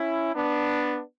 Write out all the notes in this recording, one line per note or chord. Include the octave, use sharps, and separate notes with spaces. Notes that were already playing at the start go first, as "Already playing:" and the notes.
Already playing: C#4 E4
B3 D4